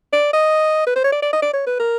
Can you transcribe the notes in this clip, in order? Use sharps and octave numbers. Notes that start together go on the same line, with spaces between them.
D5
D#5
B4
C5
C#5
D5
D5
D#5
D5
C#5
B4
A#4